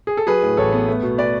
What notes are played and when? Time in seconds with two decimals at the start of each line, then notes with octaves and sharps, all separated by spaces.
0.07 G#4
0.17 A4
0.27 F#3 G#4 B4
0.43 A2
0.57 A1 A4 C#5
0.73 B3
0.88 A3
1.03 B2
1.18 B4 D5